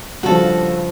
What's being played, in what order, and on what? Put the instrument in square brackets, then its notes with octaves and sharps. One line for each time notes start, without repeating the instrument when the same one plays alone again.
[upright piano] G2 C#3 F3 [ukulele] F#4 A4